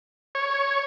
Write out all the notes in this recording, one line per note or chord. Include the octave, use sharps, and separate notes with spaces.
C#5